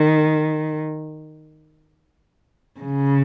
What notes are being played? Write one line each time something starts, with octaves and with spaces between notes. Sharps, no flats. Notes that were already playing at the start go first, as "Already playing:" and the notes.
Already playing: D#3
C#3